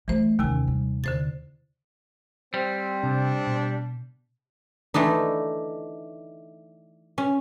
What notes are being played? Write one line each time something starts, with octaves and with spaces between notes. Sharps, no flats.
E3 F#3 A3 C5
D#2 C3 D#3 C#4 G#5
G3
E2 D3 C5 A6
G3 C4 C5
C3 D4
B2
E3 A3 D4 D#4
C#4